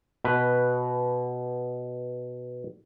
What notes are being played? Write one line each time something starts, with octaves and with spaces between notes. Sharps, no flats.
B2 B4